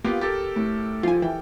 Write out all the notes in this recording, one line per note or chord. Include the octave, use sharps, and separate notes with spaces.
A#3 B3 F4 G4
G4 A4 A#4 A6
A2
F3 F4 G#5
E3 G5